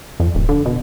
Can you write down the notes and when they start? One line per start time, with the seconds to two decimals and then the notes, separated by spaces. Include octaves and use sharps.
0.20 F2
0.35 D1
0.49 D3
0.66 B2